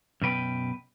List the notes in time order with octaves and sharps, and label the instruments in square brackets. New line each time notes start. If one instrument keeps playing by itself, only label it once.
[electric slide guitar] F#2 B2 B4 G5